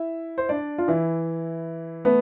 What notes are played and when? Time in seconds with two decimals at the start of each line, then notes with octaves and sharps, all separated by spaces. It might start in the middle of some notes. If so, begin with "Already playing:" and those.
Already playing: E4 E5
0.38 C5
0.49 D4 D5
0.78 F4
0.88 E3 E4
2.05 A3 B3 B4